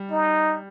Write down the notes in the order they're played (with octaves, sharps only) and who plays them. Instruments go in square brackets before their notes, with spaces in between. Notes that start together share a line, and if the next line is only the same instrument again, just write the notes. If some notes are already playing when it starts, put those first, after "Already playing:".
Already playing: [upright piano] G3
[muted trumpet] D#4